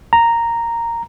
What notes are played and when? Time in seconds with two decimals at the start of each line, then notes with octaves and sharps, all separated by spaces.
0.13 A#5